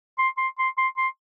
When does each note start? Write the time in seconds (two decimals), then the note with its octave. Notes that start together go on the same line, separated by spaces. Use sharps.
0.18 C6
0.38 C6
0.59 C6
0.78 C6
0.98 C6